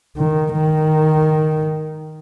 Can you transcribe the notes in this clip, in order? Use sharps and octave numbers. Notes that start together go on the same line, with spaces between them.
D#3
D#3